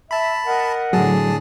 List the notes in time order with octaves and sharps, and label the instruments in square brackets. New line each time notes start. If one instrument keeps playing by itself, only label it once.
[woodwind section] E5 [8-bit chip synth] A5 B5
[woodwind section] A#4 D#5 F#5
[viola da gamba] A2 D3 [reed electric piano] F#3 [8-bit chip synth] G#4 A5